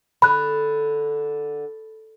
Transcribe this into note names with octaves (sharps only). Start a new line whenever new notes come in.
D3 B5 F#6